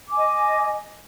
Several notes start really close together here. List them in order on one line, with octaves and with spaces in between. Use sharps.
D6 G#5 D#5